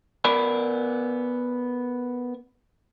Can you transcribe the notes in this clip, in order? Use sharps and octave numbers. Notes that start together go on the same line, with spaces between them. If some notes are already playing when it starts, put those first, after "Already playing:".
B3 A#4 D5 B5